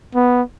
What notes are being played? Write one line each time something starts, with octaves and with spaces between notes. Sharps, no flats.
B3